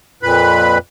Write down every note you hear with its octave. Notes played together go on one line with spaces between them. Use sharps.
F2 A#2 B4 B5